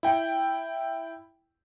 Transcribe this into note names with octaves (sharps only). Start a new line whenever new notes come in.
E4 G5